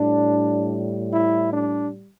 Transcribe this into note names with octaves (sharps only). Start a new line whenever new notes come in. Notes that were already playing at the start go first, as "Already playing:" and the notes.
Already playing: A2 G3 D4
E4
D4